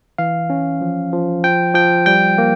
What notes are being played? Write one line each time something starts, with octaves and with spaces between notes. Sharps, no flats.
E3 F5
C#4
F3
F3
F3 G5
F3 G5
G3 G5
A#3